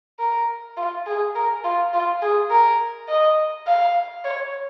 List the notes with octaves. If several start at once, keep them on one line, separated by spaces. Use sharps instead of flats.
A#4
F4
G#4
A#4
F4
F4
G#4
A#4
D#5
F5
C#5